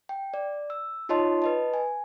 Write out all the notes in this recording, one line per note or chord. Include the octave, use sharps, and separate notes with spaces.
G5
D5
E6
D#4 F4 C#5 D#5 A5 C6
B4 D#5 A5
G#5